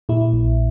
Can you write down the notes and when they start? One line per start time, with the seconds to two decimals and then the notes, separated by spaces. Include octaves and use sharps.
0.09 A#2 E4
0.33 A#1